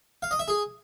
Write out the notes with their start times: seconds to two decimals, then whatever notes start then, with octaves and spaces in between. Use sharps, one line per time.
0.23 F5
0.31 D#5
0.39 E5
0.48 G#4